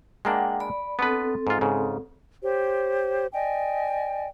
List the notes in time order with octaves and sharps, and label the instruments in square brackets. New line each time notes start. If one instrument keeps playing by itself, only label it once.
[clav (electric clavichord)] G#3 A#3 D4 [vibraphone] F#5 G5
[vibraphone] D5 B5
[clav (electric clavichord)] B3 D4 B4 [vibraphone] C4 A4
[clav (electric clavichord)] G#2 F4
G#2 C#3
[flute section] G4 C5 C#5
D5 D#5 G5 G#5